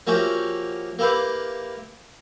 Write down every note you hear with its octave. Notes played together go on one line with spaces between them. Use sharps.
F3 A#3 C#4 F#4 G4 E5
A#3 E4 G4 B4 F5